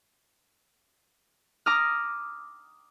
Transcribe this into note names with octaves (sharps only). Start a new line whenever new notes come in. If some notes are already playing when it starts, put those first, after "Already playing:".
A#5 D6 D#6 F6